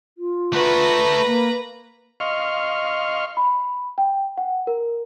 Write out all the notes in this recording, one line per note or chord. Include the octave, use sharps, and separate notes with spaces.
F4
A3 F#4 B4 A#5
A#3
D#5 F5 C6 C#6 F6
B5
G5
F#5
A#4